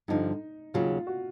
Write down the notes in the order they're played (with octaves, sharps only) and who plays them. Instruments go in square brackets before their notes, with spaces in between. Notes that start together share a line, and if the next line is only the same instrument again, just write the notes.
[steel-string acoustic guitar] G2 D3 F3 [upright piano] D#4
[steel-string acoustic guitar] D#2 C#3 F#3 [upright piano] F4
[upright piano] F#4